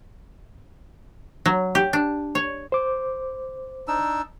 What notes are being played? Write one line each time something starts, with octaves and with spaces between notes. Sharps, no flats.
F#3
G4
D4
C#5
C5 D6
D4 D#4 E6